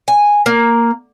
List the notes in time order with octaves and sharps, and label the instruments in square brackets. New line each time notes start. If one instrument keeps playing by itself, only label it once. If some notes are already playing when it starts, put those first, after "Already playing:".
[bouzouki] G#5
A#3